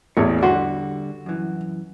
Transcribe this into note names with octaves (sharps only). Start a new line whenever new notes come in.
A1 E2 G#4 C#5
D3 G3 F#4 C6
F#2 E3